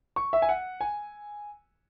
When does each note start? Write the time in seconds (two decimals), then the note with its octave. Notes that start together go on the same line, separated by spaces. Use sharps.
0.16 C#6
0.33 E5
0.42 G#5
0.49 F#5
0.81 G#5